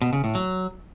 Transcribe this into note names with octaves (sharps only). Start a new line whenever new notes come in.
B2
C#3
A2
F#3